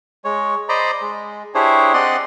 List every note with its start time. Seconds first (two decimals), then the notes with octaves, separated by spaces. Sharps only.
0.25 G#3 C#5
0.69 C5 D5 D#5 A#5 B5
1.01 G#3
1.54 D4 E4 G4 G#4 C5 C#5
1.94 C4 D5 D#5 F#5 C6